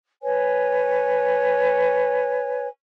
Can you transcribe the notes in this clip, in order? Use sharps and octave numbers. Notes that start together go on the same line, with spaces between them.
B4 C#5 G#5